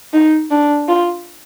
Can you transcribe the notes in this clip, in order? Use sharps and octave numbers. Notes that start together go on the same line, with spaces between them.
D#4
D4
F4